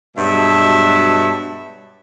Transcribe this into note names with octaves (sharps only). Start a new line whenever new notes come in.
G2 B2 F#3 G#3 E5 A5